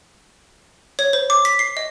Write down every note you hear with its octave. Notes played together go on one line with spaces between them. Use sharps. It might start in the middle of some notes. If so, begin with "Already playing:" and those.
C#5
C5
D6
B6
C7
D#5